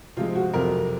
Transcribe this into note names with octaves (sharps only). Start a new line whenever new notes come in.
C3 F3 G#3 F4
F#4
F2 C3 F#3 A#4